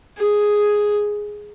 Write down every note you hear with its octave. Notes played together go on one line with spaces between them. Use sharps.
G#4